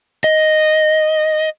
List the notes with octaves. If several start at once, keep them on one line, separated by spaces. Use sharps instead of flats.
D#5